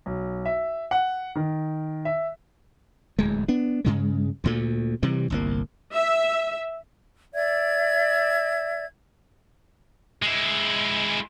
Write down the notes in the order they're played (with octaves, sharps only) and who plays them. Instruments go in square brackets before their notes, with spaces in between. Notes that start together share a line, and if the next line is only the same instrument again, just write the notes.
[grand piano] B1
E5
F#5
D#3
E5
[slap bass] D1 E2 G#3
B3 D4
G2 C#3 G#3
D2 A#2 A3
C3 E3 G3
G1 C2 A#3
[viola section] E5
[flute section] D5 E5 G#6
[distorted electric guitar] G#3 E4